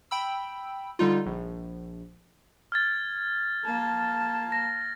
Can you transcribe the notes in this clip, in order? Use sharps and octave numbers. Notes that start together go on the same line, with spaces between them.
G5 B5 E6
D3 G3 D#4 F4
A#1
F6 G#6 A6
A#3 A5
A#6